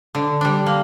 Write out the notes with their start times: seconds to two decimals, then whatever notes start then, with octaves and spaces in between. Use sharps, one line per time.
0.15 D3
0.41 G3 D4
0.66 A#3